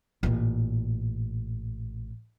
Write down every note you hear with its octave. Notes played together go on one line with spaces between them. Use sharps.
A1 A#2